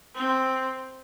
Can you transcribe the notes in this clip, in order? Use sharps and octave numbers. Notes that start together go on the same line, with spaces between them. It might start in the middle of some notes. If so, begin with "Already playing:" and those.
C4